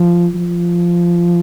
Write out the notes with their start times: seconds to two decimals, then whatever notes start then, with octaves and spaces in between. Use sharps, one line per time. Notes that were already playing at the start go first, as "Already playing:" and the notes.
Already playing: F3
0.35 F3